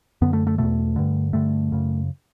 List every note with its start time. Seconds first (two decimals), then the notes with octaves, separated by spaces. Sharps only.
0.22 F#2 D3 B3
0.33 A3
0.47 A3
0.58 E2 B2 A3
0.96 G2 D3
1.33 G2 D3 A3
1.72 F#2 C#3